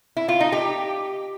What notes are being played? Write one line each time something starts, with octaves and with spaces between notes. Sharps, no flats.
E4
F4
D#4
G4